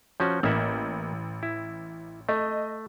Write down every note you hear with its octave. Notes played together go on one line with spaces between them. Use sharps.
F3 C#4 F#4 G6
A1 A#3 E5 F#5
E4
A3 D#5